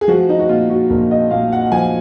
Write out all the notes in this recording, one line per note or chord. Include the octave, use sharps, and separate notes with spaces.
G#4
F3 F#4
D#4
F#4
A#2 F4
F#4
A#1 A#4
D#5
A#2 F5
F#5
F3 G#5